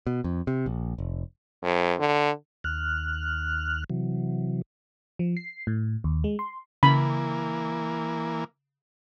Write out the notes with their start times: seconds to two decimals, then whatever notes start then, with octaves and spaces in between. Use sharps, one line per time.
0.07 B2
0.24 F2
0.47 C3
0.66 A#1
0.98 F1
1.63 F2
1.99 D3
2.64 D#2 F6 F#6
3.90 C3 E3 F#3
5.19 F3
5.37 C7
5.67 A2
6.04 D#2
6.24 G#3
6.39 C6
6.83 C#3 E3 A#3 B5